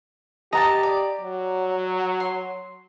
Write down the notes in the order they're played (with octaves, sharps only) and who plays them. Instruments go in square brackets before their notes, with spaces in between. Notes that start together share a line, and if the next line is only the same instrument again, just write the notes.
[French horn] G4 [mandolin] D#5 F#5 A5 [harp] A#5
[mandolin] D5
[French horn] F#3
[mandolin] C6